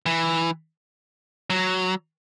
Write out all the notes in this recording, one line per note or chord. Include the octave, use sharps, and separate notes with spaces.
E3
F#3